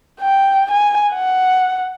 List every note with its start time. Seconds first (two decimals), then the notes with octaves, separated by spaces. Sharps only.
0.21 G5
0.71 G#5
1.13 F#5